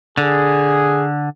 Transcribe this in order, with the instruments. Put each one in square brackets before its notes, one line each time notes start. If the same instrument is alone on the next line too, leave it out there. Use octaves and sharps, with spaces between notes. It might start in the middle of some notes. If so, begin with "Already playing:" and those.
[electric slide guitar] D3 [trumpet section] G#4